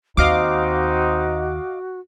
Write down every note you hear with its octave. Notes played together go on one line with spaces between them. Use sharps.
D#2 C4 D#4 F#4 D#5 F5 D6